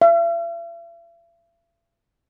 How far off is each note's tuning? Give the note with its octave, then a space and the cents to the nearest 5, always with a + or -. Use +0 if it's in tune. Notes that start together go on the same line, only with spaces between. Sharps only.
E5 +45